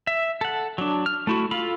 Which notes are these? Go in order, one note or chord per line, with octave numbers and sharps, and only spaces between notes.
E5
A4 F#5
F#3 D4
F6
A3 E4 F#4
F4 A4 F5 B5